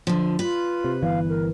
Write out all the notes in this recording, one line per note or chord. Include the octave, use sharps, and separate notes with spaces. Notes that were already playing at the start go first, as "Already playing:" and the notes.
D3 F3
F4 B4
C3
G1 E3 B3 F5
A#4